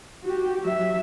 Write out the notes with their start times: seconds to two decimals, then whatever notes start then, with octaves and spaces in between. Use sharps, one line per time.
0.24 F#4 G4
0.61 F#3 E5